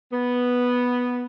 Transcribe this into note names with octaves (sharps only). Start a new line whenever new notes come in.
B3